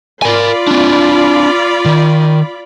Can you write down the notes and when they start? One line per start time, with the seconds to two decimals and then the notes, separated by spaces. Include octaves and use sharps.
0.22 F4 A#4 D5 G#5 B5
0.67 C4 D4
1.86 D#3